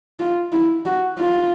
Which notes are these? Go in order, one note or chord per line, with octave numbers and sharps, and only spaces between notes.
F4
E4
F#4
F4